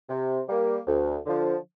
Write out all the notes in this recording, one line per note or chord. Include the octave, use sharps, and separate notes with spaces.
C3
G3 A#3
D2
D3 F3